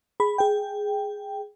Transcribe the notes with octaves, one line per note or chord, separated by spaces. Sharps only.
G#4 B5
G#4 G5